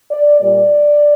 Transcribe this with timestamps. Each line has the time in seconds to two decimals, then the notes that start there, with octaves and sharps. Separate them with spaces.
0.12 D5
0.40 A#2 G3 A#3 D5